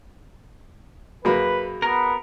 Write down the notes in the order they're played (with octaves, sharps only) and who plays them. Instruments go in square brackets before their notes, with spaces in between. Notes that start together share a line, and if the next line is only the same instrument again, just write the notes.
[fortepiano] F#2 A#3 [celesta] F#4 G#4 B5 [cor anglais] B4
[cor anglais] B3 [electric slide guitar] A#4